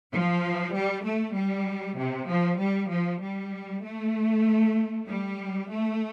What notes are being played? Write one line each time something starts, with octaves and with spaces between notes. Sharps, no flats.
F3
G3
A3
G3
C3
F3
G3
F3
G3
A3
G3
A3